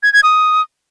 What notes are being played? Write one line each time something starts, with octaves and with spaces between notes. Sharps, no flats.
G#6
G#6
D#6